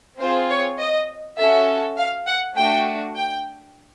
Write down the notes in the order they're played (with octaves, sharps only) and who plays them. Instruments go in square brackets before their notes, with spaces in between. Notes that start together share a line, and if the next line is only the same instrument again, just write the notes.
[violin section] C4 F4 G#4 C5
C#5
D#5
C#4 F#4 A4 E5
F5
F#5
A3 D4 F#4 G5
G5